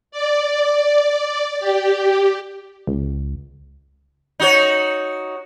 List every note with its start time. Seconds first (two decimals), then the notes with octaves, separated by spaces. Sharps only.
0.11 D5
1.60 G4
2.87 C#2
4.40 D#4 F#4 C#5